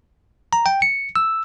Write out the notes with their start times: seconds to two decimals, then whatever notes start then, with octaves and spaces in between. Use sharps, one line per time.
0.53 A#5
0.66 G5
0.82 C#7
1.16 E6